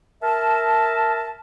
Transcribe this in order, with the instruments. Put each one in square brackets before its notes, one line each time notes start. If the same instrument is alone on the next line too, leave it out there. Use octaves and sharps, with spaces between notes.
[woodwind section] A#4 E5 A5